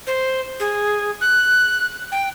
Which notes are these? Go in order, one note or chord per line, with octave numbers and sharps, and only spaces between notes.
C5
G#4
F#6
G5